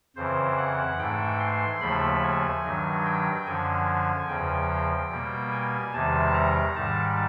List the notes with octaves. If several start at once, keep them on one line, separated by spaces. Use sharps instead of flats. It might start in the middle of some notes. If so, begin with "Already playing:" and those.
F2 C#3 E3 C5
F#5
G#2 E3 A3 G5
C6
D#2 C#3 F3 A3 B5
G#5
G2 D#3 F#3
G5
F#2 D3 F3 G#5
E2 C#3 F3 G5
B2 G3 A#3
G#5
E2 C3 D#3 G3 A5
A#5
G#2 D#3 G3 A5